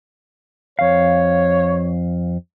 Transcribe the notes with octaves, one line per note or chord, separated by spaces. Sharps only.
F2 C#5 F5